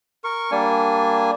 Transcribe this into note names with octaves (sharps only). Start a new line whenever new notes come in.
A#4 C#6
G3 A#3 D4 G#5